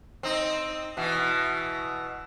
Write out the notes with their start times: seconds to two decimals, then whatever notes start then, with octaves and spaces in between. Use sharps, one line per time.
0.23 C4 D#4
0.97 B2 E3